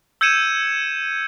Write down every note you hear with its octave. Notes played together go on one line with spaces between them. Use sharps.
E6 G6 G#6 C#7 D#7 E7